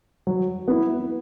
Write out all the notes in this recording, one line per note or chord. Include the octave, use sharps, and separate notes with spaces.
F#3
B3 E4